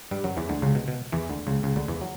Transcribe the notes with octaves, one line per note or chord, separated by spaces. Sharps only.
G2 G3
F#2 F#3
E2 E3
D2 D3
C#2 C#3
B2
B2
E2 E3
D2 D3
C#2 C#3
C#2 C#3
D2 D3
E2 E3
F#3